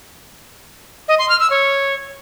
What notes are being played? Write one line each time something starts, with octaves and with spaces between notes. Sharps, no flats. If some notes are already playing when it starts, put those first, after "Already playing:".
D#5
C6
F6
E6
C#5